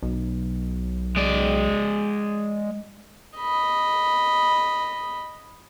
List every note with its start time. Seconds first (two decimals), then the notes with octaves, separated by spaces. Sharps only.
0.03 B1
1.16 G#3 D5
3.37 D#5 B5